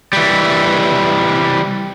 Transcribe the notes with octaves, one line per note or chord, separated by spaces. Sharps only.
E3 G3